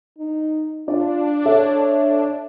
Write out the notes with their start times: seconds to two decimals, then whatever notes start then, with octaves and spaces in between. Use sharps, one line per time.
0.18 D#4
0.88 D4 F4 D5
1.45 A4 C#5 E5